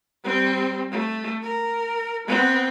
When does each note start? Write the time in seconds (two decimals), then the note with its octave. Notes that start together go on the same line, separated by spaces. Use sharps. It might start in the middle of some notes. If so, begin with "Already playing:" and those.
0.24 G3 C4
0.91 A3
1.42 A#4
2.27 B3 C4